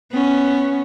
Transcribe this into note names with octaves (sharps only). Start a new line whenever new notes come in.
B3 C#4